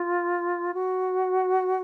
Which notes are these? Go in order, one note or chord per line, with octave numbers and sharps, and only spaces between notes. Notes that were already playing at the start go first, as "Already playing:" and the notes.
Already playing: F4
F#4